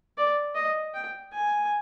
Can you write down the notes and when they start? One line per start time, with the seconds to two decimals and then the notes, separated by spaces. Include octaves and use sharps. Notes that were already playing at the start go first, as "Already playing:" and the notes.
0.18 D5
0.55 D#5
0.94 G5
1.33 G#5